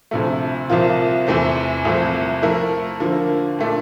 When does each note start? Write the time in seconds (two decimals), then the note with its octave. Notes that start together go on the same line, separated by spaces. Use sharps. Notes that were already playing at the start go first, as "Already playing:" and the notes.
0.11 D2 C3 F3 A3
0.70 C2 C3 F3 A#3 F4
1.27 E2 C3 E3 A3 C4
1.85 C2 C3 F3 A3
2.42 F3 A3 E4 A#4
3.00 D3 F3 A#3
3.59 A#2 A3 D4